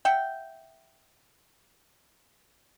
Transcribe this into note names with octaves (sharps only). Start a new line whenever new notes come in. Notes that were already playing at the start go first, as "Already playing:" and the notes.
E5 F#5 G5